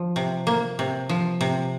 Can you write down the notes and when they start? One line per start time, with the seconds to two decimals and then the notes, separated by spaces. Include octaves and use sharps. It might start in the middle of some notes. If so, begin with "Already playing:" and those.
Already playing: F3
0.16 C3
0.47 A#3
0.79 C3
1.09 F3
1.41 C3